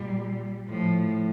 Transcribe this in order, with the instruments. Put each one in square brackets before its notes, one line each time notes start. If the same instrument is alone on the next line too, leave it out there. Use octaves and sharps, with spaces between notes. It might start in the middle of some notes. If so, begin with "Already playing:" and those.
Already playing: [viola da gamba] A#2 [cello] G3
[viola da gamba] A2 [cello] F3